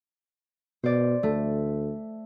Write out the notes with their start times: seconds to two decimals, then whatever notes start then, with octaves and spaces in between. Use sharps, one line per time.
0.84 B2 C5 D5
1.23 D2 A3